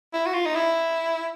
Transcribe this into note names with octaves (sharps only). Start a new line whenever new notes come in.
E4
F#4
F4
D#4
E4